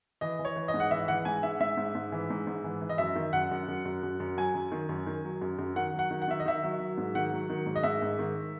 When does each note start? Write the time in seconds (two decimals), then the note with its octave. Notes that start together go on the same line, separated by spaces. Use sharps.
0.21 E3 D#5
0.39 E3
0.45 C#5
0.56 E3
0.68 D#5
0.74 G#2
0.80 F#5
0.91 E3 E5
1.08 E3 F#5
1.25 G#2 G#5
1.43 G#2 E5
1.60 G#2 E5
1.77 G#2
1.95 G#2
2.12 E3
2.30 G#2
2.47 G#2
2.64 E3
2.81 E3
2.89 D#5
2.98 F#2 E5
3.16 D#3
3.33 F#2 F#5
3.51 F#2
3.68 F#2
3.85 F#2
4.03 F#2
4.20 F#2
4.37 F#3 G#5
4.54 F#2
4.72 D#3
4.89 F#2
5.07 D#3
5.24 F#3
5.41 F#2
5.59 F#2
5.76 D#3 F#5
5.94 F#3 F#5
6.11 D#3
6.22 F#5
6.28 D#3 E5
6.40 D#5
6.46 D#3 E5
6.63 F#3
6.80 F#3
6.98 G#2
7.15 D#3 F#5
7.32 F#3
7.50 D#3
7.66 G#2
7.76 D#5
7.83 G#2 E5
8.02 G#2
8.19 D#3